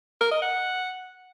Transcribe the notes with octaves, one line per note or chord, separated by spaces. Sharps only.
A#4
D#5
F#5